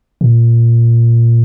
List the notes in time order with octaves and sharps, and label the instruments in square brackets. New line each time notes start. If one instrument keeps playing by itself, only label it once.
[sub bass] A#2